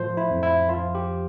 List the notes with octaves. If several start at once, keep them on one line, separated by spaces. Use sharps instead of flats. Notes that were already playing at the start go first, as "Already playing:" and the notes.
Already playing: A2 F3 C5
E4
F2
E4
F3 F4
G4